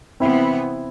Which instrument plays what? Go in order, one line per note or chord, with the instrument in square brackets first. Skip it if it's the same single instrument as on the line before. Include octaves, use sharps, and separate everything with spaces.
[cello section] C3 E3 B3 [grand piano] C4 E4